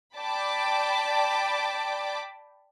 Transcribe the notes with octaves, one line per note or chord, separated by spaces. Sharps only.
D5 G5 A5 B5 D6